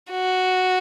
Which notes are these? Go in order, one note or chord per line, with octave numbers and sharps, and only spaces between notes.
F#4